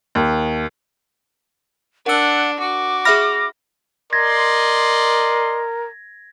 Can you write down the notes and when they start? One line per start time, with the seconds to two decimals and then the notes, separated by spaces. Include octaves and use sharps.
0.15 D#2
2.06 D4 A#4 F#5 E6
2.59 F#4 D6
3.05 G#4 E5 B5 F6 A#6
4.13 A#4 D5 D#5 C6 G#6 A#6